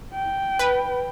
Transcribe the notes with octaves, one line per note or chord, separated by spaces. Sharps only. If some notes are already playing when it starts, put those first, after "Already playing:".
G5
B4